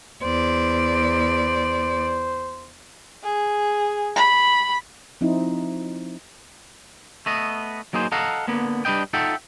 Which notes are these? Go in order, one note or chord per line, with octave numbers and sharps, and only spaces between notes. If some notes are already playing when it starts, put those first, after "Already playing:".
E2 C5 D5
G#4
B5
F3 C4 D#4 E4
A3 B3 D#5
F#3 A#3 D#4 G#4 C5
A4 D#5 F5 F#5 A#5
D3 A#3 B3
G3 D4 B4 D#5 G5
D#4 F4 A4 E5 F#5 G5